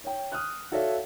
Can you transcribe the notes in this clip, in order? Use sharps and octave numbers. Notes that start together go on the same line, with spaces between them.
C#5 G5
D#6 F6 F#6
F#4 A4 C#5 D5 E5 F5